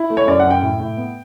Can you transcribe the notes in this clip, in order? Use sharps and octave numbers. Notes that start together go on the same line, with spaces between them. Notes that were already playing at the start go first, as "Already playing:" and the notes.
Already playing: E4
A3
C#5
F#2 D5
F#5
F#2
G5
A2
A2
B3